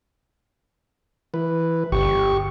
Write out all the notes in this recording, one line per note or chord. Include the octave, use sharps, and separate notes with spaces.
E3 B4
G1 G2 D3 G4 C#6